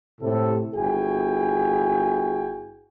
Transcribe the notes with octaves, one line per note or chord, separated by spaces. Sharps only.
A2 C3 A4
G1 E4 F#4 G#4 G5 G#5